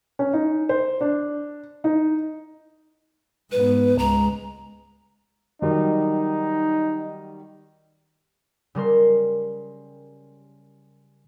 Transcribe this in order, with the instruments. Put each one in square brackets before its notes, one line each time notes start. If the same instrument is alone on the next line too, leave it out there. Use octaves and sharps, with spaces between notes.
[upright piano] C#4
D#4
C5
D4
D#4
[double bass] G#2 B3 [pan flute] B4
[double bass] C#2 G#3 [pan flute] A#5
[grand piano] D#3 F#3 G3 [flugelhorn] D#4
[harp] C#3 G3 A#4 C6